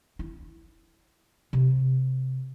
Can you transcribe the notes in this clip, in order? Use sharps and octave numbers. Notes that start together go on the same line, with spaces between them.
E4
C3